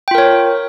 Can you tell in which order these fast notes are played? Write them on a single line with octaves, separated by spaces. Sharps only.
G5 F4 A#4 C#5